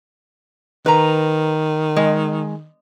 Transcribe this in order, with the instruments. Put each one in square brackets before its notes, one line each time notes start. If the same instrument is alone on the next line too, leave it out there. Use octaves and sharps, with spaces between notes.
[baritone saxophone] D#3 [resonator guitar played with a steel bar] B4 A#5
[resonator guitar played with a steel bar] G#3